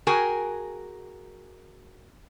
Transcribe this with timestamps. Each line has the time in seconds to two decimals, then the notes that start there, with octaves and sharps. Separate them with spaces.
0.07 F#4 G#4 A#4 G5 G#5